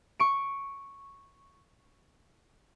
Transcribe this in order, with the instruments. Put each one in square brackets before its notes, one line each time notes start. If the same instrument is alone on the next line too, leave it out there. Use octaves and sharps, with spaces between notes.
[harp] C#6 D7